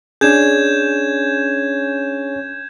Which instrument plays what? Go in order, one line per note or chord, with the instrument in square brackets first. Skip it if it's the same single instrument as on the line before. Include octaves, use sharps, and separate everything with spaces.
[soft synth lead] C#4 [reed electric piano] D4 G#4 [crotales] G6 G#6 E7